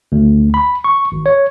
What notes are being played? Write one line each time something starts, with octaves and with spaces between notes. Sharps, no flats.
D2
B5
C#6
G#1
C#5